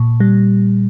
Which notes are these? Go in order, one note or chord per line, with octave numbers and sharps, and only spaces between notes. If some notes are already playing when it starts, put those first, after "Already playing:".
Already playing: A#2
G3